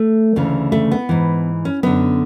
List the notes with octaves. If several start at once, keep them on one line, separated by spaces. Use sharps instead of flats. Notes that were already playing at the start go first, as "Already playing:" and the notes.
Already playing: A3
D2 C#3 E3
A3
B3
G#2 E3
C#4
F#2 D3 B3